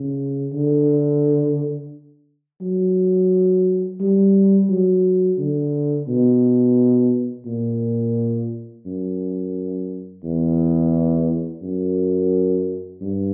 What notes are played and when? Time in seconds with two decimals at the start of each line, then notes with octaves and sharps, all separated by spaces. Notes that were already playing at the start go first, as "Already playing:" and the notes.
Already playing: C#3
0.53 D3
2.61 F#3
4.00 G3
4.69 F#3
5.38 D3
6.08 B2
7.46 A#2
8.86 F#2
10.24 E2
11.62 F#2
13.01 G2